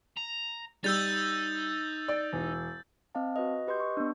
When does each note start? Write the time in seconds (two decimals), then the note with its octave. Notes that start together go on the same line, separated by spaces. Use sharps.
0.17 A#5
0.84 G3 D#4 E6 G6 A6
2.08 D5
2.33 E1
3.15 C4 D#5 F5 A5
3.36 F#4 B4 D#5
3.67 G4 B4 D#5 C6 G6
3.80 C#6
3.97 B3 D4